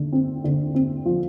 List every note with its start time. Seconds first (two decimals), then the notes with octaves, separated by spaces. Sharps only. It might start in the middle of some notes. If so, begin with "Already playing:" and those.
Already playing: D3
0.13 C4
0.44 D3
0.75 C4
1.05 F3